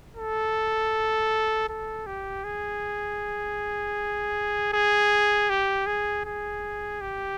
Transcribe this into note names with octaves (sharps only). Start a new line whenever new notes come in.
A4
A4
G4
G#4
G#4
G4
G#4
G#4
G4